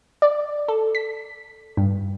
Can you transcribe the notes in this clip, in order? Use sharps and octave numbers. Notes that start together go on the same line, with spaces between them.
D5
A4
B6
G2